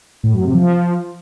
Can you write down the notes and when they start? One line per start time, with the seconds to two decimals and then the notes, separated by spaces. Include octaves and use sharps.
0.23 A2
0.34 F#2
0.44 C3
0.54 F3